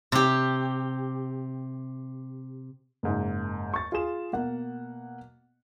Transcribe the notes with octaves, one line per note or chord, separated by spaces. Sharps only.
C3 G4
F#1 G#2
C#6 A6
F4 G#4 E7
B2 A#3 F#5